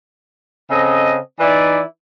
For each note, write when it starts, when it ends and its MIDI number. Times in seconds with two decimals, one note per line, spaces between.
0.70 1.18 49
0.70 1.18 60
0.70 1.18 69
0.70 1.18 75
1.39 1.81 52
1.39 1.81 63
1.39 1.81 64
1.39 1.81 71
1.39 1.81 74